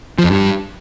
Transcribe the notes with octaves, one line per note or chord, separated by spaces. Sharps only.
F3
F2
G2